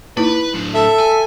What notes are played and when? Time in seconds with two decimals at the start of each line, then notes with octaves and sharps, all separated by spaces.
0.17 A#3 D#4 E4 B4
0.54 A2 D4
0.74 A4 E5
0.99 G#5